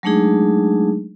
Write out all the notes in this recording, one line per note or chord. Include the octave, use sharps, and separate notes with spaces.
F#3 G#3 A3 D4 D#4 G#4